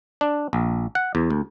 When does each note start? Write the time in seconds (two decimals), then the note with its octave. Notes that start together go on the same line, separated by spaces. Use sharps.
0.21 D4
0.53 A#1
0.95 F#5
1.15 E2
1.30 D2